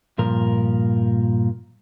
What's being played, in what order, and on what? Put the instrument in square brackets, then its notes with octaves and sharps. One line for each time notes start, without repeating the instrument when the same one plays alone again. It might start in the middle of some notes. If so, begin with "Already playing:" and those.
[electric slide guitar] G2 A#2 F3 A#4